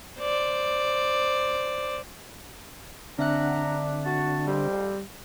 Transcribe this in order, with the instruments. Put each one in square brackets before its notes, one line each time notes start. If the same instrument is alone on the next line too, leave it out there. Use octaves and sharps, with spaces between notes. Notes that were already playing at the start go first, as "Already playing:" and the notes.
[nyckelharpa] C5 D5
[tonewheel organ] D3 [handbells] C4 E5 F#6 [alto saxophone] D4 [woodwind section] F#5 A#5
[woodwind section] F#4 A5
[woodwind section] F2 G#2 C4 [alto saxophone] G3